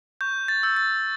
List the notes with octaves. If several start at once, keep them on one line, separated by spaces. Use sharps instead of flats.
C#6 G6
A6
E6 G6
A6